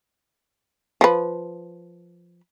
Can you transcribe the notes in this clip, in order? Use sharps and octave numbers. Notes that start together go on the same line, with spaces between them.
F3 B4